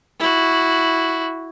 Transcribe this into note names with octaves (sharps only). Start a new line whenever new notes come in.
E4 F#4